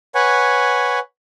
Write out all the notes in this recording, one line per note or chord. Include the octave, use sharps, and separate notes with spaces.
B4 C#5 F#5 G#5